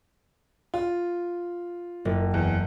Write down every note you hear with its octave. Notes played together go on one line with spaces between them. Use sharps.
F4
F#1
E2